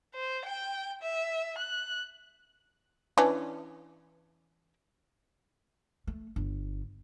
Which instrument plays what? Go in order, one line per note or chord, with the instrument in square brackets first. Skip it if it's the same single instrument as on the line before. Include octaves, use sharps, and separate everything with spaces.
[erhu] C5
G5
E5
F#6
[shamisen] E3 C#4 D4
[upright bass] A3
G1